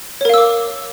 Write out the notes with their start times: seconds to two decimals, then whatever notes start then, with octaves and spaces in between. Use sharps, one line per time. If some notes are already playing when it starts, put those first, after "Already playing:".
0.21 C#5
0.25 A#4
0.29 F5
0.34 E6
0.38 D6